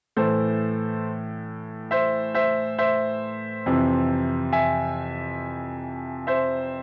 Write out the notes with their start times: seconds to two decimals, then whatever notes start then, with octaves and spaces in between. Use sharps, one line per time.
0.16 A2 E3 A4 C5
1.91 C5 E5
2.35 C5 E5
2.78 C5 E5
3.66 F2 C3 E3
4.52 E5 G#5
6.27 C5 E5